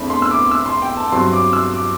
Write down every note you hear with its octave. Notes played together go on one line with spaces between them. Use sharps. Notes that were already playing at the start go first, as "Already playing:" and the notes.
Already playing: E2 D3 A3 C4 B5
C6
E6
D6
E6
C6
G5
A5
G2 F#3 C4 C6
D6
E6
D6